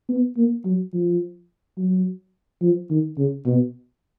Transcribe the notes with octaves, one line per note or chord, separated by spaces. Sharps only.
B3
A#3
F#3
F3
F#3
F3
D#3
C#3
B2